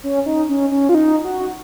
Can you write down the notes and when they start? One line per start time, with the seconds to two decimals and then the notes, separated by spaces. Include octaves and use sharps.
0.03 C#4
0.26 D#4
0.49 C#4
0.71 C#4
0.89 F4
0.95 D#4
1.24 F#4